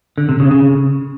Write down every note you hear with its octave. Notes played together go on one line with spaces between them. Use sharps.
D3
C3
C#3
C#3